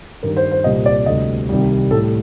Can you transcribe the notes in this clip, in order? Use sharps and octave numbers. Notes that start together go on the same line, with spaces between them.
G2 D#3 G3 A#4
C5
C5
C2 A#2 G3 D#5
D5
D2 C3 G3 D#5
C2 C3 D#3 G3
A2 G3 A4